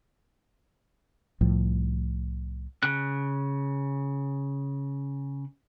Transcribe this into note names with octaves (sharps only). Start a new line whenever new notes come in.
C2 A2 F3
C#3 F#6